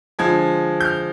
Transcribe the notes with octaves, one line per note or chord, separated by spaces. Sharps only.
D3 F3 G#3 G#6
G6
F6